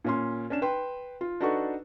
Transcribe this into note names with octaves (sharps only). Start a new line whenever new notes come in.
A#2 C#4 C6
C#4 D4 E7
B4 G5 C6
F4
D4 D#4 F#4 A4 B4 C#6